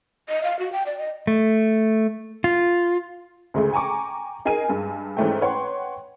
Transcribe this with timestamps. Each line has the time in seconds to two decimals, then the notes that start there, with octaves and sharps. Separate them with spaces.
0.29 D#5
0.44 F5
0.59 F#4
0.73 G5
0.86 D5
0.99 D#5
1.27 A3
2.44 F4
3.54 D2 C#3 G#3 A3
3.73 G5 G#5 A#5 C#6 D6
4.45 D#4 G#4 A#4 G#5 D#7
4.68 G2 G#3 G#5
5.17 G#2 E3 G#3 A3 C#4 G5
5.42 B4 C#5 F#5 G5 C6